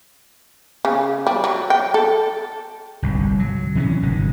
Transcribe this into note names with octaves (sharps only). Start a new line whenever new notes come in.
C#3
G3
F#3
G5
A4
G1 C2 G#2
F#3
C3 E3 C4 C#4
G1 G#2 D#3